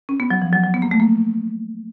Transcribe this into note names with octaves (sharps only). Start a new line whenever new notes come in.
C#4
B3
F#3
F3
F#3
F#3
B3
A#3
A3
A#3